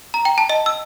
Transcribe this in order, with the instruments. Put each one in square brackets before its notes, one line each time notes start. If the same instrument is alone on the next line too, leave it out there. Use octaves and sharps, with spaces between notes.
[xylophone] A#5
G5
A5
D#5
E6